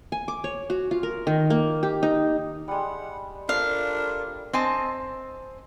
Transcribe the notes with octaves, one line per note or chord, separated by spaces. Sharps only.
G#5
D6
C#5
F#4
F4
A#4
D#3
A#3
G4
D#4
G3 G#3 F#5
D4 F4 A4 A#4 F5
C4 D#5 G#5 A5